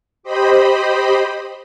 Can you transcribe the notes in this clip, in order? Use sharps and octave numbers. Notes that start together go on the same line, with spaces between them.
G4 C5 D#5 B5